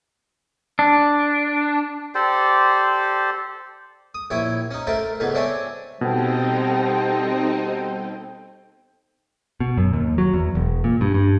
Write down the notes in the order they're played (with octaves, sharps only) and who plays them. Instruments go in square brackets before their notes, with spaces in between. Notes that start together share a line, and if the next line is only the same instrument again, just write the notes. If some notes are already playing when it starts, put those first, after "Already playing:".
[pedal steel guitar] D4
[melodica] G4 A4 C5 D5
[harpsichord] D#6
A#1 E4 C#5 G5
C#4 D#4
A3 A4 A#4 C5 E5 G5
C#2 G#2 A3 B3
C4 D4 C#5 E5 G5 G#5
[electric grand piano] B2 [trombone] G3 [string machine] C4 D#4 D#5 [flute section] A4 C5 G5
[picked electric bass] B2
F#2
D#2
F#3
E2
E1
A#2
G2
G2